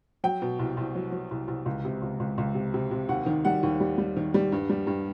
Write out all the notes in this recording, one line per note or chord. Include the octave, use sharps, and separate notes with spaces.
F#3 G5
B2
C2
C2
F#3
F#3
C2
C2
C#2
C3
C#2
C#2
C#2
C3
C3
C3
D#2 F#5
D#3
G3 F#5
D#2
G3
G3
D#3
G3
G2
G3
G2